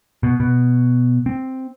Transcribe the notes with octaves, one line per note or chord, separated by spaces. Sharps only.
B2
B2
C4